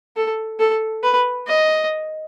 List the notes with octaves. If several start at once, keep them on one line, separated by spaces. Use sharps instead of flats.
A4
A4
B4
D#5